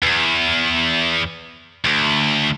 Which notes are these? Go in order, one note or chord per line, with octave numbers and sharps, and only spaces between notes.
E2
D2